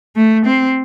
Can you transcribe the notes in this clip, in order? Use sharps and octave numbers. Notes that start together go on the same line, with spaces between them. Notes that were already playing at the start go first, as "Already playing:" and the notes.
A3
C4